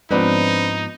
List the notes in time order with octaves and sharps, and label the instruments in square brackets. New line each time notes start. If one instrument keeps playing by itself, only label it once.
[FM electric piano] G#2 F3 B3 [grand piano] C4 D4 B4 [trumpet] D#4